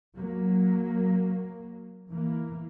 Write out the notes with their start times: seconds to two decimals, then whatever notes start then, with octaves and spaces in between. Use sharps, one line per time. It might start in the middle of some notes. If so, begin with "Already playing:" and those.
0.16 F#3 A#3
2.09 E3 A#3